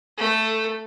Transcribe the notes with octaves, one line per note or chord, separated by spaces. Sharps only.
A3 A4